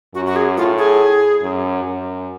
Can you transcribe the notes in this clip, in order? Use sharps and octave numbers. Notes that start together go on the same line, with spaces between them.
F#2 F#4
F#4
G#4
A2 F4
G#4
F#2
F#2